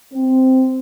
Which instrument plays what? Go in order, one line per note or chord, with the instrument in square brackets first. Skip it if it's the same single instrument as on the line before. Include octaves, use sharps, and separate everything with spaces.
[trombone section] C4